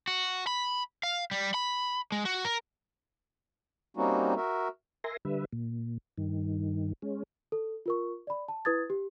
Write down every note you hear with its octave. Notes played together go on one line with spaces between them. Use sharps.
F#4
B5
F5
G3
B5
G#3
F#4
A#4
G3 A#3 C4 C#4 D#4 F#4
F#4 A#4 E5
A#4 E5 G#5 C6 A#6
D3 G3 B4 E5
A#2
G2 D#3
G#3 C#4
A4
F4 A#4 C#6
D5 B5
A5
E4 B4 D#6 G#6 A6
G4